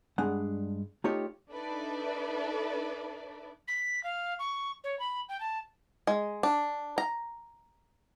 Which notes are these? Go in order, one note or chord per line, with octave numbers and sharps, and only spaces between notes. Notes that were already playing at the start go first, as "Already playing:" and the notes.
G2 G#3 D4 F#5
A3 D#4 F4 G4 C#5
D4 D#4 A4 B4 D5 E5
B6
F5
C#6
C#5
B5
G5
A5
G#3
D4
A#5